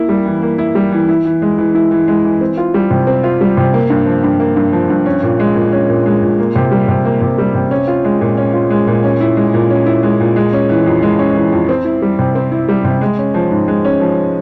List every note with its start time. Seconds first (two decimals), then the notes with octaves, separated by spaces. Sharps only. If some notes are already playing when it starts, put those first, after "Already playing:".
Already playing: A#3 E4
0.09 G3
0.26 E3
0.42 A#3
0.58 E4
0.75 G3
0.92 E3
1.09 E4
1.25 E3
1.42 G#3
1.58 E3
1.75 E4
1.91 E3
2.08 G#3
2.24 E3
2.41 C4
2.57 F4
2.74 G3
2.91 C3
3.07 C4
3.24 F4
3.41 G3
3.57 C3
3.74 A#3
3.90 G2
4.06 F3
4.24 G2
4.40 A#3
4.56 G2
4.72 F3
4.90 G2
5.06 C#4
5.23 A#2
5.39 G#3
5.55 A#2
5.73 C#4
5.89 A#2
6.06 G#3
6.22 A#2
6.39 A#3
6.55 C3
6.72 G3
6.88 C3
7.05 A#3
7.21 C3
7.38 G3
7.55 C3
7.71 C#4
7.88 F4
8.05 G#3
8.21 A#2
8.37 C#4
8.54 F4
8.70 G#3
8.87 A#2
9.04 C#4
9.20 E4
9.37 G#3
9.54 A#2
9.70 C#4
9.86 E4
10.03 G#3
10.20 A#2
10.36 G#3
10.53 C#4
10.69 E3
10.86 F2
11.02 G#3
11.19 C#4
11.36 E3
11.52 F2
11.69 C4
11.85 E4
12.02 G3
12.19 C3
12.35 C4
12.52 E4
12.69 G3
12.85 C3
13.01 G#3
13.18 C#4
13.34 F3
13.51 G#2
13.68 G#3
13.84 C#4
14.01 F3